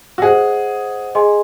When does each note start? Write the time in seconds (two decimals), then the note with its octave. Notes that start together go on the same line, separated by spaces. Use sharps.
0.18 F#4
0.22 G#4 C5 D#5 F#5
1.15 G#4 D#5 G#5 C6